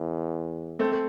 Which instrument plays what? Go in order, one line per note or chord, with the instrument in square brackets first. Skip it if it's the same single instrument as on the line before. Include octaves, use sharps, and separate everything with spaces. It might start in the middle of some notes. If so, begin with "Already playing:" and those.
Already playing: [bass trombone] E2
[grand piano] A3 C4
A3